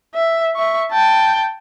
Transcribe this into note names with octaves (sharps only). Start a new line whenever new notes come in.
E5
E5 C#6
G5 A5